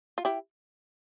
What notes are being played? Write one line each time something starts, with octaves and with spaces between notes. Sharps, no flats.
F4
E4 G4